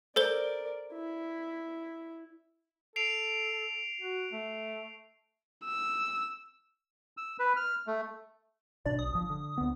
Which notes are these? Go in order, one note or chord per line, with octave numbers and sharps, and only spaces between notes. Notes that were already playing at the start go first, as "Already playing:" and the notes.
A4 A#4 C5 D5 G7
E4
A4 C7 D7 F7
F#4
A3
E6
E6
B4
F6
A3
G#1 B2 D4 D5
B1 D#6
G1 F3
D3
D2 B3